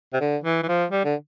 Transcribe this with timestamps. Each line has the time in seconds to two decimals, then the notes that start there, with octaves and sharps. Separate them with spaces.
0.13 C3
0.20 D3
0.44 E3
0.63 E3
0.68 F3
0.91 G3
1.05 D3